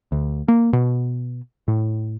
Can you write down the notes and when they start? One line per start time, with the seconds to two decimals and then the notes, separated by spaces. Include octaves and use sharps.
0.12 D2
0.48 A#3
0.73 B2
1.68 A2